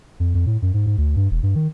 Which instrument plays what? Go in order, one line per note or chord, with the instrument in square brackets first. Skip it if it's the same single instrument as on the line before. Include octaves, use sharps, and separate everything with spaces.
[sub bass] F2
F2
A2
F#2
G#2
G#2
D2
G2
E1
G2
D#3